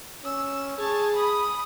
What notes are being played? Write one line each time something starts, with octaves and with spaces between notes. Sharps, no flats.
C#4 E6
G#4 C#5 A5
B5 D#6